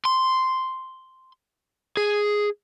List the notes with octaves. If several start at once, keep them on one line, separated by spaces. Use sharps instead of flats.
C6
G#4